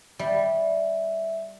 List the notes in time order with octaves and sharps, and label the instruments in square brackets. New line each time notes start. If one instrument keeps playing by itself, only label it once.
[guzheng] G3 [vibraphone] E5